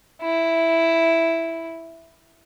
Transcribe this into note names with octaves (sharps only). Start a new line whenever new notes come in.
E4